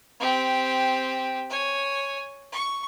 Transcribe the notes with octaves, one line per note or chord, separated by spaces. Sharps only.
C4 G4
C#5 G#5
C#6